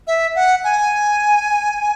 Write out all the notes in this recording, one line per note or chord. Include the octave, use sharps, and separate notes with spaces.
E5
F#5
G#5